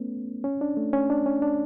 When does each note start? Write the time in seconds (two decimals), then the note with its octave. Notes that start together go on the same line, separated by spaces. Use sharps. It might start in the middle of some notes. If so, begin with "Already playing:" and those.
Already playing: A3 B3 C#4
0.44 C#4
0.61 D4
0.77 A3
0.93 C#4
1.10 D4
1.26 C#4
1.42 D4